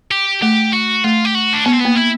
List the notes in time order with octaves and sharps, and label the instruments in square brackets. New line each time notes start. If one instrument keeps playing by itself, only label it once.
[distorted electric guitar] G4
[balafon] A3 [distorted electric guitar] G4
[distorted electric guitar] F#4
[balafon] A3 [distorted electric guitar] F4
[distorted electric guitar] G4
F#4
D4
[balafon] B3 [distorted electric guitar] C#4
[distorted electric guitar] C4
[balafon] A#3 [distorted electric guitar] B3
[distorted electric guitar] E4